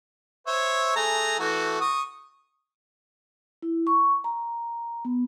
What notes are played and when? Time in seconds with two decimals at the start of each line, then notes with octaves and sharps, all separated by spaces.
0.47 C5 C#5 E5
0.96 A3 G#4 A#5
1.39 E3 A3 F#4
1.81 C#6 D#6
3.62 E4
3.87 C#6
4.24 A#5
5.05 B3